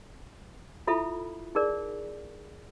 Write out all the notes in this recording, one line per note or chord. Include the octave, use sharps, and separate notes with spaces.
E4 F4 A4 E5 B5
D#4 G#4 A#4 D5